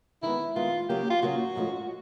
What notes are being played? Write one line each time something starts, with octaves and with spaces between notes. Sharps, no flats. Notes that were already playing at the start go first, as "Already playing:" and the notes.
D#3 G#3 B3 E4
D#3 G#3 B3 F4
C#3 F#3 A#3 C#4 G4
F4
C#3 F#3 A#3 C#4 F#4
G#2 F3 A3 C#4 F4